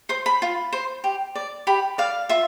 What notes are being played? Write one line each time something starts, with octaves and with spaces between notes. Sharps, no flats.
C5 C6
B5
F4
C5
G4
D5
G4 B5
D5 F5
F4 E5